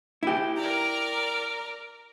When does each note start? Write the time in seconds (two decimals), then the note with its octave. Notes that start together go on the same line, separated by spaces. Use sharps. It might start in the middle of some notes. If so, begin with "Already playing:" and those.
0.23 E4 G4
0.57 A#4 D5 A#5